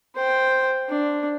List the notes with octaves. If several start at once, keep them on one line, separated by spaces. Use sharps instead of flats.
C5 G5
D4